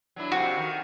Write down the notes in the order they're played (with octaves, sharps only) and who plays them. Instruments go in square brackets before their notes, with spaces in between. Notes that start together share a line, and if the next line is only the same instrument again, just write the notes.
[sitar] F#3 D4 E4
[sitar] F2 C3 [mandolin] F#4
[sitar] D#3